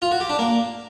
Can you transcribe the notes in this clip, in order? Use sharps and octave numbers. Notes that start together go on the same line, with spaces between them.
F4
F#4
G4
D4
A#3